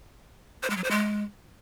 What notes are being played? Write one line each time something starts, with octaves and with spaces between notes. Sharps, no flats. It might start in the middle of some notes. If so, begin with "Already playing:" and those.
C5
G#3
F#3
C5
G#3